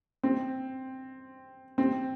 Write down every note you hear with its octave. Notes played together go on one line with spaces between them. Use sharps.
C4
C4